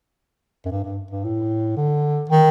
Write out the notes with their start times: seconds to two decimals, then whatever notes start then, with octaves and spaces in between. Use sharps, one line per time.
0.66 F#2
0.71 G2
0.84 G2
1.11 G2
1.25 A2
1.77 D3
2.30 D#3